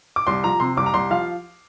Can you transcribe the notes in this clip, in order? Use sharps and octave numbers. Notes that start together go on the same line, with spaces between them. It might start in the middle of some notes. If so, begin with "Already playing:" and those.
D6
C2 C6
F3 A#5
C3 C6
C2 D6
A#5
C2 C6
F3 F5